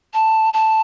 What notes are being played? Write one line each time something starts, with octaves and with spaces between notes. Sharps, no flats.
A5
A5